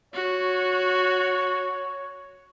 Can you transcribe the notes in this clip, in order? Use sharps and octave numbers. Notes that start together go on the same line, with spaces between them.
F#4 C#5